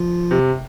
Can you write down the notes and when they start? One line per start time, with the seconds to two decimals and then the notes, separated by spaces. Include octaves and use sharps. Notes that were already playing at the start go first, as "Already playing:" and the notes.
Already playing: F3 F4
0.31 C3